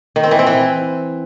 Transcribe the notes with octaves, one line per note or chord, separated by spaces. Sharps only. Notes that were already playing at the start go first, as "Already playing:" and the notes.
D#3
C4
E3
C4
E3